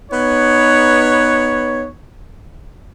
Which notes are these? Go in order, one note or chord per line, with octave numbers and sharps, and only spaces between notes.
B3 D#4 B4 C#5